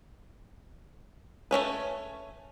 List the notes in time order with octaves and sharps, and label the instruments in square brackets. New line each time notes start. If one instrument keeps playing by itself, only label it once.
[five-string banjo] A3 C4 C#4 B4